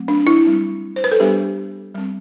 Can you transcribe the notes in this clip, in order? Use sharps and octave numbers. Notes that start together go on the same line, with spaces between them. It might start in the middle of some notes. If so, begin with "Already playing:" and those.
Already playing: F#3 A3 C4
D4
E4
G3 C4
C5
B4
A4
G3 B3 D4 G4
G3 C4